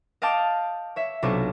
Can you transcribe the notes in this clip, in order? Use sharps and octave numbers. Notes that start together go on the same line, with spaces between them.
D#5 F5 G5 A5 D6
C#5 E5
B1 C3 D4 F4 C#6